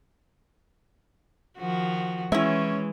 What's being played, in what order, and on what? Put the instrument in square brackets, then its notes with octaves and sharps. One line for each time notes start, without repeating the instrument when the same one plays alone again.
[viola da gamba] D#3 F3 F#4
[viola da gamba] E3 [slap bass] G#3 [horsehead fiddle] C#4 C#5 [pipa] E4 E5